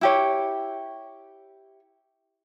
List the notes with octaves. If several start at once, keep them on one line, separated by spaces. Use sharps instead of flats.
E4 G4 C#5